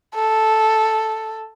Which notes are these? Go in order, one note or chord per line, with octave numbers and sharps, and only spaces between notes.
A4